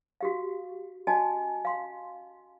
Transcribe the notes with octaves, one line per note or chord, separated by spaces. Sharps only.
F#4 G4 F5
C#4 F#4 D#5 G#5 A5
F5 C6